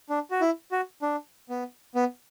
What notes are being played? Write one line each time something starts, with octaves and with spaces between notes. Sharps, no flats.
D4
F#4
E4
F#4
D4
B3
B3